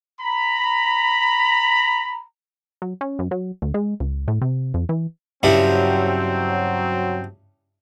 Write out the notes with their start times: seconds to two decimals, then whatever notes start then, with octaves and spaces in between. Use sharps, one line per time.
0.20 A#5 B5
2.82 F#3
3.01 C#4
3.19 F#2
3.31 F#3
3.62 D2
3.74 G#3
4.00 C#2
4.28 A2
4.42 C3
4.74 F2
4.89 E3
5.43 G2 C#3 F#3 C4 E4